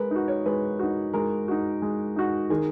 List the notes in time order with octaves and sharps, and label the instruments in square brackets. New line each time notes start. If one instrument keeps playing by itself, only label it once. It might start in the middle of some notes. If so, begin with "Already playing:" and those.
Already playing: [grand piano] G#3 [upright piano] A#4 B4
[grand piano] D#4 F#4
[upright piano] C#5
[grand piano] G#3 [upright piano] B4
[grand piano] D#4 F#4
[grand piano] G#3 [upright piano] A#4
[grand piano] D#4 F#4
G#3
D#4 F#4
[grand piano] D#3 [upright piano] G#4